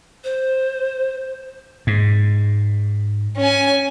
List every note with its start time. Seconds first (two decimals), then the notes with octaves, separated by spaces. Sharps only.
0.24 C5
1.87 G#2
3.37 C#4 G#5